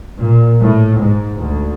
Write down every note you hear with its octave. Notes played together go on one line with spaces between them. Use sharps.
A#2
A2
G#2
D2